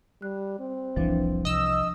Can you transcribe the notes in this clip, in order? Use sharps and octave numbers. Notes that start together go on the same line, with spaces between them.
G3 F#6
C4
F1 C2 E3 F3 D4
C2 D#5 E6